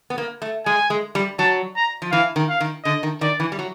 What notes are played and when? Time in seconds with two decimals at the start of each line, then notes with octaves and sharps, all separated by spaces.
0.10 B3
0.18 A#3
0.42 A3
0.66 G#3 G#5
0.90 G#3
1.15 G3
1.39 F#3 A5
1.76 A#5
2.02 F3
2.12 E3 F5
2.36 D#3
2.49 F5
2.60 D#3
2.85 D3 D#5
3.03 D#3
3.21 D#3 D5
3.40 E3
3.52 G3
3.59 F#3